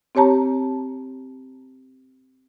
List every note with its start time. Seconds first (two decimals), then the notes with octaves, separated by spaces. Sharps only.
0.15 C4 G4 C#5 A5 A#5